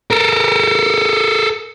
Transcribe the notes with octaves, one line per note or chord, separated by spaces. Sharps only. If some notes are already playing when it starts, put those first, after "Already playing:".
A4 A#4